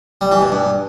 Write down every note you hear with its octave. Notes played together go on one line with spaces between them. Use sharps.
G3
E3
B2
G2